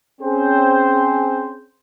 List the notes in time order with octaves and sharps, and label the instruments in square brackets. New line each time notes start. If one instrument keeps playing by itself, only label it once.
[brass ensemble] C4 C#4 G#4 C5